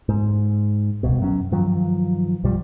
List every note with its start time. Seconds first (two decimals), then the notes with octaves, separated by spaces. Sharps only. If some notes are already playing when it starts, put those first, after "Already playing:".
0.09 G#2
1.03 D1 C2 B2
1.20 F#2 F#3 C#4
1.51 G2 D#3 F3 F#3
2.43 B1 G2 F3 G3